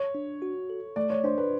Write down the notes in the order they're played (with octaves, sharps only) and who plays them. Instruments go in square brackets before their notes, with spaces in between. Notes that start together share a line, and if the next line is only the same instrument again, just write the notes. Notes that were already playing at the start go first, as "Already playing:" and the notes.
Already playing: [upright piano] C#5
[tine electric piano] D4
F#4
A4
[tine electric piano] A3 [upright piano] D5
[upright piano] C#5
[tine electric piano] D4 [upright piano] C5
[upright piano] B4